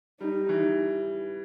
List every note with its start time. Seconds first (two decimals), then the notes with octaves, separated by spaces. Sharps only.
0.20 G3 D#4
0.49 E3